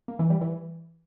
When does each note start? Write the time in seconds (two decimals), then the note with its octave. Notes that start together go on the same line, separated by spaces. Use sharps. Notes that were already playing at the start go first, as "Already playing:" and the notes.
0.08 A#3
0.19 E3
0.30 G3
0.41 E3